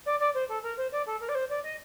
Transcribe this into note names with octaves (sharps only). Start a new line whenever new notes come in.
D5
D5
C5
A4
A#4
C5
D5
A4
A#4
D5
C5
D5
D#5